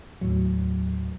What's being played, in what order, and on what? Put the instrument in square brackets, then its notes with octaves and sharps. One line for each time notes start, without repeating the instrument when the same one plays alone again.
[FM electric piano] D#2 A2 F#3